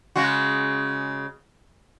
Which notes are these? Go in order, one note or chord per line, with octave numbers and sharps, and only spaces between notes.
C#3 G#3 F#4